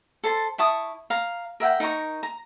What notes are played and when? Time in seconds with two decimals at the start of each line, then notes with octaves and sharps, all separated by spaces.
0.24 A4 C5 A5
0.58 E4 A5 C#6 D#6
1.10 F5 A#5
1.60 A#4 E5 F#5 G5
1.80 D#4 A#4 A#5 C#6
2.23 A#5